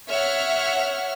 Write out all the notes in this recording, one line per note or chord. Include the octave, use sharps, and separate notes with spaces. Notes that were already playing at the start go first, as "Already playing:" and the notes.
C#5 E5 F#5 F6